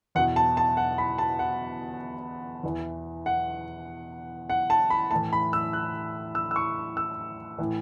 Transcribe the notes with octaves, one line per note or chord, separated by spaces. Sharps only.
E2 B2 F#5
A5
A5
F#5
B5
A5
F#5
E2 E3
F#5
F#5
A5
B5
A2 E3 A5
B5
E6
F#6
E6
E6
C#6
E6
A2 E3